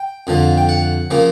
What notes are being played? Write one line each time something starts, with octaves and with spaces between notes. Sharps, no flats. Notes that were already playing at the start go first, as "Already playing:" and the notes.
Already playing: G5
F2 D3 F3
G5
F#5
C#3 F3 A#3